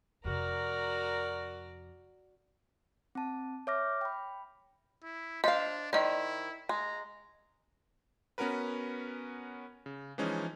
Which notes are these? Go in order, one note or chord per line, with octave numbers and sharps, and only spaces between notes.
F2 C3 F#4 A#4 D5 A#5
C4 A5
C#5 E5 D6 F6 A#6
G5 B5
E4
D4 C5 D#5 F5
D#3 E4 C5 D5 D#5
G#3 A#5
B3 C#4 F#4 A#4 B4
C#3
E3 F3 G#3 C#4 D#4